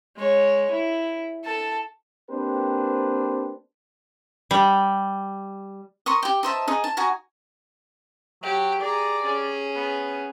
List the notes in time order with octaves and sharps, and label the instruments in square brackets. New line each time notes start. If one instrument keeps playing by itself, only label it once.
[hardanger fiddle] G#3 C#5
E4
A4 A5
[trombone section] A#3 C4 D4 G4 B4 C5
[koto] G3
[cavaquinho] A#4 C6 C#6 D#6
G4 G5
D#4 C5 E5 A5
D#4 G#4
A5
D#4 F#4 G#5 A#5
[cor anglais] F#3 [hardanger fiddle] G4
[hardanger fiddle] G#4 A#5 [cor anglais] D5
[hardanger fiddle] C#4 G#4
[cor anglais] B3